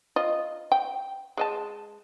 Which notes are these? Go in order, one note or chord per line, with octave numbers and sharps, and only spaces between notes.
F4 D#5
G5
G#3 D#5 A5